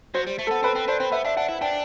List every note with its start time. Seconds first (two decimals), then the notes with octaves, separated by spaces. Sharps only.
0.14 F#3 C5
0.27 G3
0.39 A3
0.47 A4
0.51 B3
0.63 C4 B4
0.76 C4
0.88 D4 C5
1.00 C4
1.12 B3 E5
1.25 D4 E5
1.37 D4 F#5
1.49 E4
1.61 D4 G5